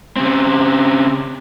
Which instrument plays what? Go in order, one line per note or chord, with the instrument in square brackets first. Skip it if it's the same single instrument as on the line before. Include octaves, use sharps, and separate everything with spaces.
[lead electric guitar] C#3 C4